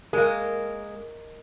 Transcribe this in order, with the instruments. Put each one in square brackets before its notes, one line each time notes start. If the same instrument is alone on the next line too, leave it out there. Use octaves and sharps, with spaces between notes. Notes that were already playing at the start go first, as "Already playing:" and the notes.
[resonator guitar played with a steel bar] G#3 A#3 [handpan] A#4 D#5